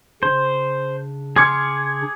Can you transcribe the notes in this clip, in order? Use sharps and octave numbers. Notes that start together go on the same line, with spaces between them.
C#3 D4 C5
G#4 C6 D6 F6 G#6 C#7